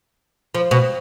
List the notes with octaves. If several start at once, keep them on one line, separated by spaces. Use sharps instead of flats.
F3
B2